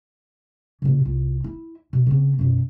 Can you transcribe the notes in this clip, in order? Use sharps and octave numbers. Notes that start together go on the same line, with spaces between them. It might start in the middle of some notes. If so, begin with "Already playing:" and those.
A#2 C#3
C2 F4
E4
B2
C#3 C4
F#2 B2